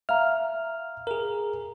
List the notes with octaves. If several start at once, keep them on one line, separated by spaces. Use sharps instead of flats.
E5 F5 A#5 F6
G#4 A#4